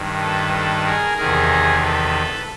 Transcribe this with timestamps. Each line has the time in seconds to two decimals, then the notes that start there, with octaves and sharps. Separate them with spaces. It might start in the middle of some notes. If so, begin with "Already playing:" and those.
Already playing: G2 D#3
0.21 A4 B4
0.53 A4 B4
0.86 G#4 A#4
1.18 E2 C3 D#3 G#4 A#4
1.83 A4 B4